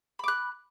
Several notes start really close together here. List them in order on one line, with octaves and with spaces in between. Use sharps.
B5 D6 F#6